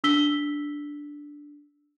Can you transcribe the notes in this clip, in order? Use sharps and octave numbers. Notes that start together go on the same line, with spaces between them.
D4 E6 B6 G7